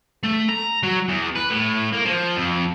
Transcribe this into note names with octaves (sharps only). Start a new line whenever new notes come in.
A3
A#5
F#3
E2
B4
A2
A#3
F3
F2